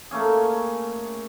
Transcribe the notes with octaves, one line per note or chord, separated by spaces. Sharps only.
A3 A#3 C#4 G#4